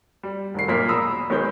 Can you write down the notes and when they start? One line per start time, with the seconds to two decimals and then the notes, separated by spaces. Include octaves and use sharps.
0.23 G3
0.54 F1 D#3 C7
0.68 B1 A#2 A#3 A#4 B6
0.88 E1 A#5 B5 D#6 E6
1.30 B1 D#3 G#3 B3 C#5 G6